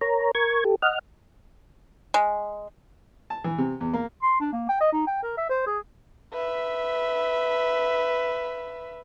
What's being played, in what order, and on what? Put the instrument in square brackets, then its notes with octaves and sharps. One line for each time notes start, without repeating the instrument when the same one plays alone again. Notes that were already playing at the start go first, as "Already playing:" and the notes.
[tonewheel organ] A#4 C#5 A#5
A#4 C#6 G#6
G4 A4
D#5 F#5 F6
[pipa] G#3
[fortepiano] A5
E3
C3
E2
A#3
[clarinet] C6
D4
A#3
G5
D#5
D#4
G5
A#4
E5
C5
G#4
[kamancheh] B4 E5